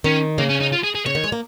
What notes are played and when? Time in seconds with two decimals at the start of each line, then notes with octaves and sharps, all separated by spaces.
0.04 D#3 C#4
0.38 C#3 A#3
0.50 C#4
0.62 D#4
0.73 F4
0.84 G#4
0.95 G#4
1.06 C#3 C#5
1.15 D#3
1.24 G#3
1.32 A#3